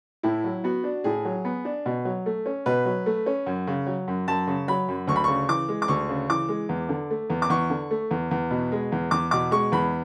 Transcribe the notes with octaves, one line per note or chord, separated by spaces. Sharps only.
A2 E4
F#3
B3 F#4
D4
A2 G#4
F#3
B3
D4
B2
F#3
A3
C#4
B2 B4
F#3
A3
C#4
F#2
C#3
F#3
F#2
F#2 A5
C#3
F#3 B5
F#2
D2 C#6
B5
C#3 C#6
E3 D6
G#3
D6
D2 C#6
C#3
E3 D6
G#3
E2
D3
A3
E2
D6
E2 C#6
D3
A3
E2
E2
B2
G#3
E2
E2 D6
B2 D6
G#3 C#6
E2 B5